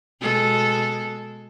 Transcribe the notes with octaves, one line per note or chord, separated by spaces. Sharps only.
B2 G#3 A4